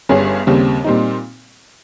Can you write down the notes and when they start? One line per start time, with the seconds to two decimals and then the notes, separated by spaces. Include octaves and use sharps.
0.09 G1 G2 G3 C#4 G#4
0.47 D#2 C#3 G3 C4
0.84 A#2 G3 C4 D#4